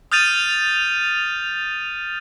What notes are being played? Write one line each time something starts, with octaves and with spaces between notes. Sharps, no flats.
D#6 F6 G6 A6 D#7 F7